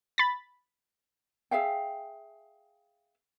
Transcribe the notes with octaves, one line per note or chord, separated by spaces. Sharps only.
B5 A6
G#4 E5 F5 G5